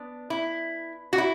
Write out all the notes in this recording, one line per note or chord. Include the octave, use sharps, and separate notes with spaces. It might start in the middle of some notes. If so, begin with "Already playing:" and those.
Already playing: B3 D4
E4
F#4
E4